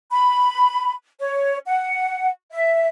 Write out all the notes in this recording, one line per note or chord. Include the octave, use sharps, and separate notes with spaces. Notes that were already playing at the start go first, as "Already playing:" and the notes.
B5
C#5
F#5
E5